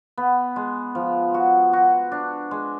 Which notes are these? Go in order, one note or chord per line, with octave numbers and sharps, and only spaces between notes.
B3
G#3
F3
F#4
F#4
D4
G#3